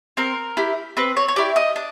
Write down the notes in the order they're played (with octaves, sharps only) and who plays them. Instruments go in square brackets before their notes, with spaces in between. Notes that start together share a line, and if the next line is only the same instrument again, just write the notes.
[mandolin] C4 A#4
E4 G4
C4 B4
C#5
C#5
E4 G4 D5
D#5
D4